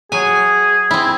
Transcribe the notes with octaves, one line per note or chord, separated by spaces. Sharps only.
F#3 G#4 G#5
C4 E4